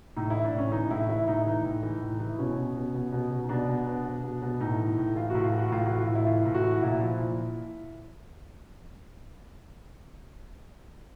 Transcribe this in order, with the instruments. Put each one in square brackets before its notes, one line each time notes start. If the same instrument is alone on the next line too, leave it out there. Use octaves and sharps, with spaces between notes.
[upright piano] A2 D#4
E3 E4
D4
A2 C#4
E3 D#4
A2 E4
E3 E4
A2 D#4
E4
E3 D#4
A2
E3
A2
E3
B2 C#4
B2
B2
B2
B2
B2
D#4
B2 D4
B2
B2
B2
B2
B2
A2 D#4
E3
A2
E3 F4
A2 F#4
F4
E3 F#4
A2 F4
E3 F#4
F4
A2
E4
E3 F4
A2
F#4
E3
A#2 E4
F3
A#2